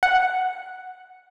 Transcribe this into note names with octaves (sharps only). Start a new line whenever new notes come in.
F#5